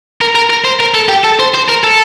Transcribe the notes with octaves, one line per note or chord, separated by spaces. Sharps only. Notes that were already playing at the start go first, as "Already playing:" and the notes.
A#4
A#4
A#4
C5
A#4
A4
G4
A4
C5
C5
A#4
A4